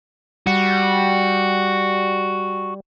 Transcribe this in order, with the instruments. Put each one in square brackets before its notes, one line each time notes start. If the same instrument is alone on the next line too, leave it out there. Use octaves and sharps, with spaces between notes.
[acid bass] G3 [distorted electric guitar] F#4